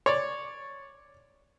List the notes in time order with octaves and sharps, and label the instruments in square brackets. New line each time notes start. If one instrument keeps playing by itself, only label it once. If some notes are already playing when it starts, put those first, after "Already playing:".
[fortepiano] C#5 D5